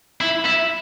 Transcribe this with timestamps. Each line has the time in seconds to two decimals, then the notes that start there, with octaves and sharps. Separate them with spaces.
0.21 E4
0.46 E4